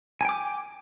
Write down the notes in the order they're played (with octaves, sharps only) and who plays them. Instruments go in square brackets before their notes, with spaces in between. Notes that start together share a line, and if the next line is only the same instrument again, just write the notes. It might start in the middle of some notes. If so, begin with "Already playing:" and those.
[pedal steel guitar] G#5
G5
D6